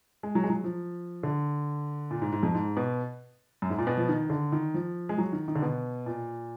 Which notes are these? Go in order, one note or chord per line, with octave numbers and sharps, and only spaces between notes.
G#3
F#3
G#3
F#3
F3
D3
A#2
G#2
G#2
F2
G#2
B2
F#2
G#2
A#2
B2
F3
D#3
D3
D#3
F3
G#3
F#3
D#3
D#3
D3
B2
A#2